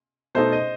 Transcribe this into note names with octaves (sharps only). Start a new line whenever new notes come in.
B2 A3 D#4 A4 C5
D#5